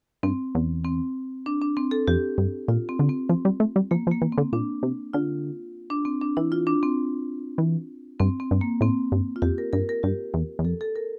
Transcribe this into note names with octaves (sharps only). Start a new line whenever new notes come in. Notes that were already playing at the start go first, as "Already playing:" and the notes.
G2 C4
E2
C4
D4
D4
C4
A4
F2 G4
G2
A#2 F4
C4
D3
C4
F3 C4
G3
A3
G3
F3 A#3
F3
A#3
E3
C4
D3
A#2 D4
C3
D3 F4
D4
C4
D4
E3 E4
F4
D4
C4
E3
G2 C4
C4
G2
A#3
A2 C4
G2
F4
F2 G4
A#4
G2 A#4
A#4
G2 G4
E2
E2
F2 A4
A4
A#4